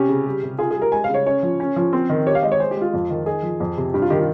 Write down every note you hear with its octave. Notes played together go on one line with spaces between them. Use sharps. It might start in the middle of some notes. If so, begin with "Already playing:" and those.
Already playing: C3 C#4 G4
C#3
G3
C3
F4 G#4
G#4
G3
A#4
G#3 G#5
C#3 F5
C#5
C#4 C#5
F3
C#4
F3
C4
D#3
G4 C#5
F5
G#3 D#5
C#5
G#4 C5
G4
G#3 F4
F2
D#3
D#4 G#4
F3
F2
C3
G2 G4
F4
D#3 G4
F4